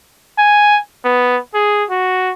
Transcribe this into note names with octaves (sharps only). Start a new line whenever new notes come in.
G#5
B3
G#4
F#4